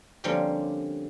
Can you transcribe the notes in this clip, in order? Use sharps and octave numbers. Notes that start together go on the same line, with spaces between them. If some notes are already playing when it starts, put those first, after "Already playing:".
D3 F3 G3 A#3 C4 C#4